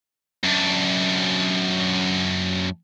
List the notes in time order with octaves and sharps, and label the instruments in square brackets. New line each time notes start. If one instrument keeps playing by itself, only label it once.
[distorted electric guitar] F#2 D4